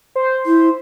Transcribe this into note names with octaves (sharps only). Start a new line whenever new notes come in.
C5
E4